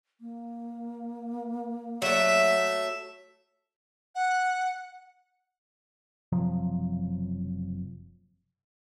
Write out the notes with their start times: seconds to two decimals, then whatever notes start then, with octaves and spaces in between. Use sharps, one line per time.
0.21 A#3
2.02 F#3 A3 E5
4.15 F#5
6.32 F#1 C3 F3 F#3